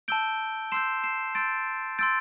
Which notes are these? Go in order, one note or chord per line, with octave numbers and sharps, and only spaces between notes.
A5 E6 G6 D7 G7
C6 E6 G6 C7 E7
C7 E7
C6 E6 G6 A6 D7
C6 E6 G6 A6 D7